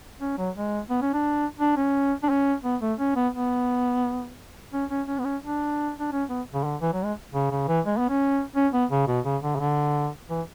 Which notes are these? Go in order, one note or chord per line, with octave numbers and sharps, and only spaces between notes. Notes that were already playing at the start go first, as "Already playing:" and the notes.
C#4
F#3
G#3
B3
C#4
D4
D4
C#4
D4
C#4
B3
A3
C#4
B3
B3
C#4
C#4
C#4
B3
C#4
D4
D4
C#4
B3
C#3
D3
E3
F#3
G#3
C#3
C#3
E3
G#3
B3
C#4
C#4
B3
C#3
B2
C#3
D3
C#3
D3
E3